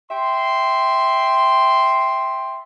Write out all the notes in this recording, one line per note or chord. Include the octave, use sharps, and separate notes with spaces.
E5 G5 C6